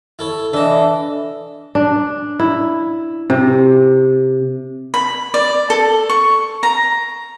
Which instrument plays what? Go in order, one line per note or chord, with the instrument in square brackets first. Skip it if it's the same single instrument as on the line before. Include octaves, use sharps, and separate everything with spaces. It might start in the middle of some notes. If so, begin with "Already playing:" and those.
[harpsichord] E4 A4 C#5
[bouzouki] E3 E5 [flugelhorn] D4 [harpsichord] A4 D#5
[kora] D4
E4
C3
[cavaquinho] B5
D5
A4
C#6
A#5